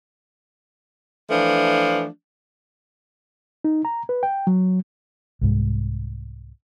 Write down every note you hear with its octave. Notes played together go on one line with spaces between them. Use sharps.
E3 F3 A3 D4
D#4
A#5
B4
G5
F#3
C2 G#2 G#3